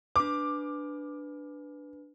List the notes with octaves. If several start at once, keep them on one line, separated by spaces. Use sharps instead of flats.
D4 B4 D6